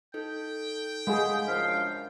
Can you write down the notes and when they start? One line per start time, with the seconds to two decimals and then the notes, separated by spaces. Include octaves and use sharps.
0.14 D#4 A4 G5
1.07 G#3 G#4 F5 F#5 B5
1.48 F#2 F3 D4 F5 B6